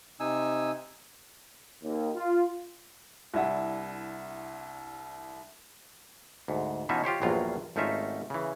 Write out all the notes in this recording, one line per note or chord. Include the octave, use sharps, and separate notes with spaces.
C3 D#4 G#5 E6
D#2
F4
C2 D4 E4 E5 F#5
D2 G#2
B2 E3 C#4 D#4 F4 E5
F4 G4 C5 C#5
A#1 E2 G2 F#3 F4 F5
G#1 A3 C#4 D#4 F4 E5
C#3 E3